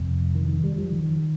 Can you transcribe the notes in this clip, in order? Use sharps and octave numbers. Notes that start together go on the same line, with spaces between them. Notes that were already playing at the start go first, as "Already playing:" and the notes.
Already playing: F2 C3
D#3
D#3
G3
F3
D#3